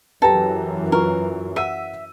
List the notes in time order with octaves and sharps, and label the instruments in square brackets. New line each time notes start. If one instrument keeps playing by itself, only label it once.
[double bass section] F#2 E3 [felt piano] G4 B4 G5 [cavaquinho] A4 A#5
[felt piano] F4 B4 C#6 [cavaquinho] A#4
[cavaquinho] E5 [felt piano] F#5 E6 D#7